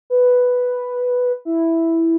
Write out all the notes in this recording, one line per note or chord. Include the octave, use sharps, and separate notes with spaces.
B4
E4